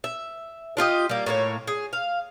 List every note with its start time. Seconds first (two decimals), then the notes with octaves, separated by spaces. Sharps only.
0.04 E5
0.77 D4 F4 G4 D#5
1.09 G3 A#3
1.26 A2 A#3 E4 C#5
1.68 G#4
1.93 F5